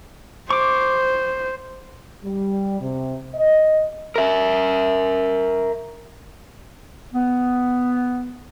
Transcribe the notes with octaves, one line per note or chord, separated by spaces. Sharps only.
C5 C#6 D6
G3
C3
D#5
A#4 E5
B3